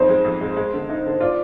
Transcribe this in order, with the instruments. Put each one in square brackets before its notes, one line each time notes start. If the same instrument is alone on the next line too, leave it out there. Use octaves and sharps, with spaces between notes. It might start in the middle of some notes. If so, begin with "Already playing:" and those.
Already playing: [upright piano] F2 D#4 [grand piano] C5
[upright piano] G#3
F2
G#3
G#3
D3
D#4
D3
[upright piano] F4 [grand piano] D5